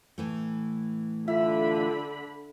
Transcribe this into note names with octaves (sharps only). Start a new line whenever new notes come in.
A2 E3 A3
D3 F4 E5 B5